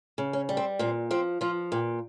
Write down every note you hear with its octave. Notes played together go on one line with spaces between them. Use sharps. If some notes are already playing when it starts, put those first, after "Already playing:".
C#3
C#4
G3
C4
A#2 C4
F3 C4
F3 F4
A#2 G4